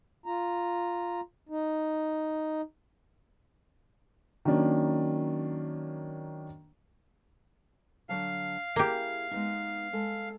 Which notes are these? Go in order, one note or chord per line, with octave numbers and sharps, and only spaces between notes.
F4 A#5
D#4
D#3 F#3 A#3 C#4 D4
D3 F#3 F5 A5
A#3 E4 G4 G#4
G#3 B3 D#4
G#3 A4